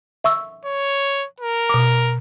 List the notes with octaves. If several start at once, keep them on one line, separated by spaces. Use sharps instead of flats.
E5 C#6 E6
C#5
A#4
B2 D6